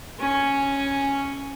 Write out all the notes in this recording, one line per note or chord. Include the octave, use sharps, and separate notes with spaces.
C#4 G#5